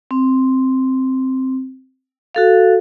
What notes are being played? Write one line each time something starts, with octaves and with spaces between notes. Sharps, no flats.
C4
F#4 A4 F5